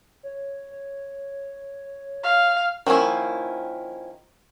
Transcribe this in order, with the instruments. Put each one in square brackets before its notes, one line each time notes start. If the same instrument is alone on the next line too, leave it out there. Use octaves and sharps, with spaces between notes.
[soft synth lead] C#5
C#5
[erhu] F5
[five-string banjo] D#3 F3 A#3 C#4 E4